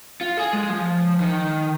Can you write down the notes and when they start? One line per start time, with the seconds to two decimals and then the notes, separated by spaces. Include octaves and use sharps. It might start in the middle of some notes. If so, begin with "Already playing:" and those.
0.21 F4
0.37 G#4
0.53 G#3
0.70 F3
1.20 D#3